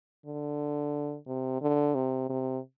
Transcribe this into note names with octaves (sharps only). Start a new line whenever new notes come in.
D3
C3
D3
C3
C3